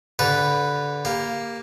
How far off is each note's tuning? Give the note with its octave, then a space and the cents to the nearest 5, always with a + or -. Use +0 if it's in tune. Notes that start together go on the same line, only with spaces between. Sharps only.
D3 -20 G4 +0 B4 +0
A#3 +0 G4 +15